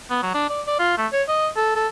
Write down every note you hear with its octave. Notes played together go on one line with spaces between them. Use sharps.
B3
F#3
D4
D5
D5
F4
A3
C#5
D#5
A4
A4